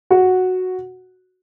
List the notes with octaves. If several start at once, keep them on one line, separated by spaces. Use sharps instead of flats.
F#4 F#5